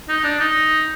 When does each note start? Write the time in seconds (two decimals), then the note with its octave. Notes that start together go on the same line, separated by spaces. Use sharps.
0.09 D#4
0.24 D4
0.40 D#4